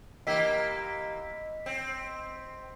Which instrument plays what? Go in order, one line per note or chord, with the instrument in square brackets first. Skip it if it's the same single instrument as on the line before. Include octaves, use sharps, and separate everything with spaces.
[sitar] E3 A#3 G4 [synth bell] D#5 E6 B6
[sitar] C4